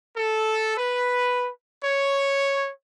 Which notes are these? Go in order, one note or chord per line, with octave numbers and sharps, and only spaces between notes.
A4
B4
C#5